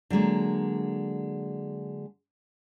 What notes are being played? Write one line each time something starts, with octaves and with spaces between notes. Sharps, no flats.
D3 F#3 G#3 A#3